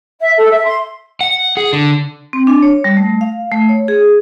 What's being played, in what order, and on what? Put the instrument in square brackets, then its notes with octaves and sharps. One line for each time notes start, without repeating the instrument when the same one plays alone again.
[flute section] E5
A4
E5
C6
[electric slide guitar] F#5
G#4
D3
[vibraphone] C4
D4
C#5
G3
A3
F5
A3
C#5
G#4